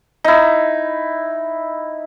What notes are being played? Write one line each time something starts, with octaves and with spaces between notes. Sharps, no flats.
D#4 E4